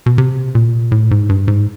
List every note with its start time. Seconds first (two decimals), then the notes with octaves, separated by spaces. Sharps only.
0.06 B2
0.18 C3
0.55 A#2
0.92 A2
1.11 G#2
1.29 G2
1.48 G#2